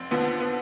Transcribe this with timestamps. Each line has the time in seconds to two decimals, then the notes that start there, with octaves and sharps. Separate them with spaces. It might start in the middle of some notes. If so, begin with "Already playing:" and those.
Already playing: F1 C4
0.11 D#2 D3 F3 B3
0.40 B3